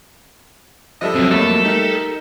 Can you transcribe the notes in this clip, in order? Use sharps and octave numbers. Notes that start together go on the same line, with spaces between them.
D3 F3 G3 A4 D#5 E5
C2 F#3 C4
F2 F#3 G3 A3 A#3 A4
D#4 G4 A#4